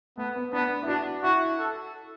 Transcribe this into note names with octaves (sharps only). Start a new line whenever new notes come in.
A3 B3
B3
B3 D4
E4
D4 F#4
E4 F#4
A4